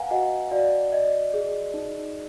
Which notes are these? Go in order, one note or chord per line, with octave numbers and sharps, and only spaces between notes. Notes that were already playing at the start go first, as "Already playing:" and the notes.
Already playing: B4 F5 F#5 G#5 A#5
F#4 D#5 F#5
F#4 D5 F5
D5 D#5
G#4
D#4